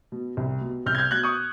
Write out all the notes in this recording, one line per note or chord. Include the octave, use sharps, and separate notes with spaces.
B2
C2
B2
C2 F6 G6
G#6
F6 G6
B2 F#6 G#6
C#6 D#6